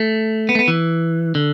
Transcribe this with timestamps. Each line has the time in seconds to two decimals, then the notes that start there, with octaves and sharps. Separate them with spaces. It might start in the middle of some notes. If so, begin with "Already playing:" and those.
Already playing: A3
0.49 B3
0.55 A3
0.59 B3
0.68 E3
1.35 D3